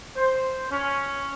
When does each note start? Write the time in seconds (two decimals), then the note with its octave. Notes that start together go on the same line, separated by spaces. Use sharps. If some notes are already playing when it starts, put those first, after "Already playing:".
0.16 C5
0.71 C#4